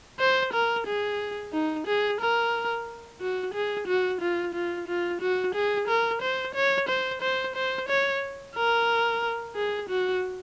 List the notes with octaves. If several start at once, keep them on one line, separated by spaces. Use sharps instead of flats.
C5
A#4
G#4
D#4
G#4
A#4
F#4
G#4
F#4
F4
F4
F4
F#4
G#4
A#4
C5
C#5
C5
C5
C5
C#5
A#4
G#4
F#4